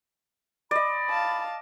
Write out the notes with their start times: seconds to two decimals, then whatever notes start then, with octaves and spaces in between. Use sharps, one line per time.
0.71 D5 D#5 B5
1.10 F5 A5